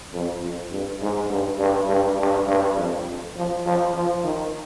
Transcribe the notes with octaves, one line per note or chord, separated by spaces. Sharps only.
F2
F2
G2
G#2
G2
G2
G2
G2
G2
F2
F3
F3
F3
D#3